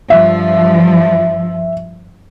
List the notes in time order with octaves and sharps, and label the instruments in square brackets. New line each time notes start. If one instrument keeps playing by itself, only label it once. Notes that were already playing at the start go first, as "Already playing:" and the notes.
[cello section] G2 F3 [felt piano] E5